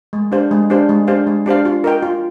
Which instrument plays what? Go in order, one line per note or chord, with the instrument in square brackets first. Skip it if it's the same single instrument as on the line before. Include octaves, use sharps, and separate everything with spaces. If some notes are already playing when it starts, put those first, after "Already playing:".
[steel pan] G#3
D4 G4 C5 F5
G#3
D4 G4 C5 F5
G#3
D4 G4 C5 F5
G#3
D4 G4 C5 F5
F4
A#4 D#5 G5
F4